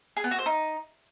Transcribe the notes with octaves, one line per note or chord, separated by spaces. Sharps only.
G#4
B3
F#4
C5
D#4